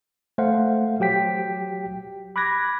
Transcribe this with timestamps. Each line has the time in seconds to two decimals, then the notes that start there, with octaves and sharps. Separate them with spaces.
0.38 A3 C5 F5 F#5
1.00 F#3 G4 G5 B6
2.36 B5 D6 F#6 G#6 A#6